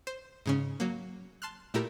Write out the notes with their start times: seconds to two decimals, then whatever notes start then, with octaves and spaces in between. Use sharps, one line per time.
0.07 C5
0.46 G#2 C#3 C#4
0.80 F#3 A#3
1.42 A5 C6 F6 F#6
1.74 A#2 A3 E4 G4 A#4